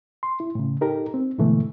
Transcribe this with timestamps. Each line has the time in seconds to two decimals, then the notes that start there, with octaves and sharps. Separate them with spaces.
0.23 C6
0.40 E4
0.55 A2 C#3
0.81 D#4 G4 A4 A#4
1.14 C4
1.38 G#2 B2 D3 E3 A3